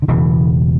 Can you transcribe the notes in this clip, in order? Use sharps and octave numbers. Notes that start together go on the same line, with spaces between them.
D3
E1 E2 C#3 E3